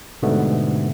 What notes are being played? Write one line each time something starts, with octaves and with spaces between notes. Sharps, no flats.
G#2 B2 D3 G3 A3 B3